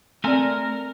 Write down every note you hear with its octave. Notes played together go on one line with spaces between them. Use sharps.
A3 C4 A4 A#4 D5 G#5